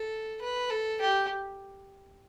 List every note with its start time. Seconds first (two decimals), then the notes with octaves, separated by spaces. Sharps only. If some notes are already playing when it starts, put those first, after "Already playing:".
Already playing: A4
0.42 B4
0.70 A4
1.01 G4